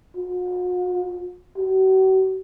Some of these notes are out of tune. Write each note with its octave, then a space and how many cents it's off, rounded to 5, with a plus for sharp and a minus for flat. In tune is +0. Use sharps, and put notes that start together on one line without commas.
F#4 -45
F#4 +45